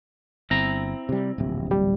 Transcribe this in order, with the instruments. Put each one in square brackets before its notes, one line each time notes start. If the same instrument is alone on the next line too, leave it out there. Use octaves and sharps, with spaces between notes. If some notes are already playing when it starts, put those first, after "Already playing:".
[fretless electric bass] G1 [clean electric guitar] C4 E4 A#5
[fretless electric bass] C3 G3
D1 A#1 C3
[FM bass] G3